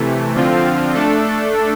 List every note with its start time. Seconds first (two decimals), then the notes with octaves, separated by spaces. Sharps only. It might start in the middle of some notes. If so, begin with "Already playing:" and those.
Already playing: C3 E3 A3
0.35 D3 F3 C4 F4
0.94 A3 D4 A4